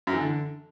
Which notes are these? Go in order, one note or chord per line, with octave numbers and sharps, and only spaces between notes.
F#2
E3
D3